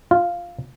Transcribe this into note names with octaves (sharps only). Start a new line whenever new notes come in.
F4